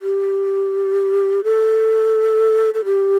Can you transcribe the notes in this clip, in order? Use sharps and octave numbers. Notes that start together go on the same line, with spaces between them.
G4
A4
A4
G4